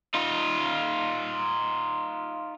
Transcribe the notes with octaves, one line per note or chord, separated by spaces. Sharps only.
D#4 F4